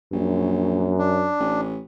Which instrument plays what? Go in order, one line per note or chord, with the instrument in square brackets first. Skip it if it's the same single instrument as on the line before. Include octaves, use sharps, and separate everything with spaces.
[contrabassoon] A#1 [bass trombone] F#2
[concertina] D4
[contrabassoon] A1